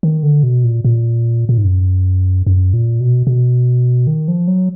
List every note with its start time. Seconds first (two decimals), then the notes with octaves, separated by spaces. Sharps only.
0.03 D#3
0.23 D3
0.43 B2
0.64 A#2
0.85 A#2
1.49 A#2
1.58 G#2
1.64 F#2
2.47 F#2
2.73 A#2
3.00 B2
3.27 B2
4.07 D#3
4.28 F3
4.48 F#3